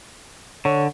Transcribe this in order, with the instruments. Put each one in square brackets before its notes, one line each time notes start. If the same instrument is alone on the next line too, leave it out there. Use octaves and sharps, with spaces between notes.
[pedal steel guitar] D3 [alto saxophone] C#5